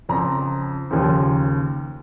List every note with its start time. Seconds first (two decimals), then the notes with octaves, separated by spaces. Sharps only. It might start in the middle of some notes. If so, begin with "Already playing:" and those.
0.09 F2 C#3 F3 A#5
0.91 D#2 C#3 F3